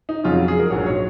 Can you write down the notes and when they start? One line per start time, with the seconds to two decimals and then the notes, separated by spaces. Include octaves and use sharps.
0.09 D#4
0.24 F2 C#3 F#3 C#4 F4
0.35 F#4
0.48 G#4
0.59 A#4
0.70 A#1 G#2 F#3 C#5
0.86 C#5